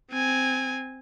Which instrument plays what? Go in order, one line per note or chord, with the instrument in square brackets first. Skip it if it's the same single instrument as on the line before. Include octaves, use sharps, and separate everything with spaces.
[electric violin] C4 G#5